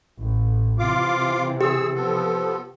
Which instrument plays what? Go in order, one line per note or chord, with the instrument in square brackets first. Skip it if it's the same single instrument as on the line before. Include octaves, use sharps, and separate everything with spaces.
[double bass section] A1
[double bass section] C3 E3 [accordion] F4 F5 D6
[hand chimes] G4 [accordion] G#4 E6
[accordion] F3 B3 A4